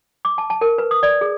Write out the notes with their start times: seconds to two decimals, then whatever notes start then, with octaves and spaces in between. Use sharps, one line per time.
0.25 D6
0.38 A5
0.50 A5
0.61 A#4
0.78 B4
0.91 D#6
1.03 D5
1.21 G#4